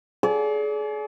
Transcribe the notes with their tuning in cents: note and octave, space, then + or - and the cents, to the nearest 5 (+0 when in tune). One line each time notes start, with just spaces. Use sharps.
G#4 +35 D5 -30